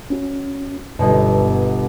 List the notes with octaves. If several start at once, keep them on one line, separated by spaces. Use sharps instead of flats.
C#4 F#4
G1 G2 B2